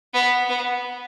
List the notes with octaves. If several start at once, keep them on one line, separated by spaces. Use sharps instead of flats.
B3
B3